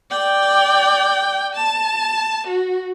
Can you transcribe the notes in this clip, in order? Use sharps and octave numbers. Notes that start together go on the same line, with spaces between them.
D5 G5
A5
F#4